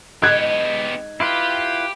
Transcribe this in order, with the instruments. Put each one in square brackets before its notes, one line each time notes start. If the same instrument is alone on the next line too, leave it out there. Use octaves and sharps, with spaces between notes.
[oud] G#3 D#4 [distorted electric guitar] B3 G4 [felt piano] F#6 G#6
[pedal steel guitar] E4 F4 B4 [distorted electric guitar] G4